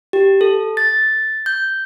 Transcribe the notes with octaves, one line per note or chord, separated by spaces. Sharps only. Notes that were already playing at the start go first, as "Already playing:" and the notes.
G4
A4
A6
G6